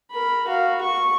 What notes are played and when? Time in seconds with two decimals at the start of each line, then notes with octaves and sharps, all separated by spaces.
0.11 A#4 B5
0.47 F#4 F5
0.81 C#6